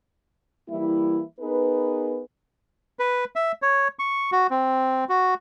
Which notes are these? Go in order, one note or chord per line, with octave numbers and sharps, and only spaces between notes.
E3 G3 A#3 E4
B3 D#4 G#4 A#4 B4
B4
E5
C#5
C#6
F#4
C4
F#4